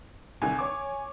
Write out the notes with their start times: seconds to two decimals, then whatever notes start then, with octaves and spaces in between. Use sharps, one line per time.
0.42 C2 D3 D#3 G#5
0.59 C#5 D6